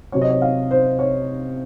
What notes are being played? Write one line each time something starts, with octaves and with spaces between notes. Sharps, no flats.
C3 F#3 C4 C#5
D#5
C#5
F5
C5
C#5